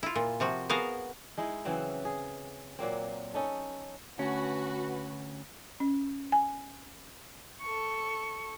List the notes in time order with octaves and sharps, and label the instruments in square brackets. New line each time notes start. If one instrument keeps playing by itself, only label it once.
[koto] E4 F4
A#2
C3 F3 F#4
B3 F#4 G#4 A#4 F5
[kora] G#3 D#4 E4
C#3 E3 F#3 C4
G#4
A#2 F#3 A#3 C4
C#4 D#4 A4
[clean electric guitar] D2 C#4 [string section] F#4 B4
[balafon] C#4
G#5
[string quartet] A4 C#6